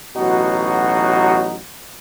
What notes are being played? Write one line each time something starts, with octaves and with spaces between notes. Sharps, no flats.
A1 B2 F#3 D#4 F#4